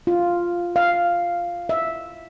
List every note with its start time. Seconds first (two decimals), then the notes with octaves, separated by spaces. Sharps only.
0.07 F4
0.76 F5
1.69 E5